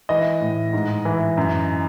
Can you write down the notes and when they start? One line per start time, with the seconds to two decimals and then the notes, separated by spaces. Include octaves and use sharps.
0.09 E3 D#5
0.41 A2
0.73 G#2
1.05 E3
1.37 F#2